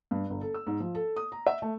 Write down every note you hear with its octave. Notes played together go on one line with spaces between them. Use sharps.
G2
G1
A4
E6
G#2
F3
A4
D#6
A#5
E5
A3